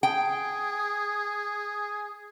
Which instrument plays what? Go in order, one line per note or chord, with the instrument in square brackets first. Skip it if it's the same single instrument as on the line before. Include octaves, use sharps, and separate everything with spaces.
[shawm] G#4 [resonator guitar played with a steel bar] G5